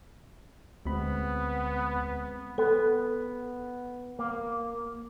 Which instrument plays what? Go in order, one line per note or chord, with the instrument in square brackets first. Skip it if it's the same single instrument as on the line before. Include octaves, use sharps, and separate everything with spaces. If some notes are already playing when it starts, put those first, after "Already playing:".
[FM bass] D2 [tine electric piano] G#3 C4 B5 [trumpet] B3
[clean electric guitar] B3 [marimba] A4
[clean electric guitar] A#3